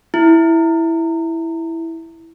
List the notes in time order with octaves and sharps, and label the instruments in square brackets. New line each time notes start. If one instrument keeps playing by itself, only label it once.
[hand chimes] E4